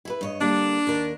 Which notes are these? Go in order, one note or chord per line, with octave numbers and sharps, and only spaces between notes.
E4 A4 B4
G2 C#5 D#5
D3 G3 A#3 D4
D#2 A#4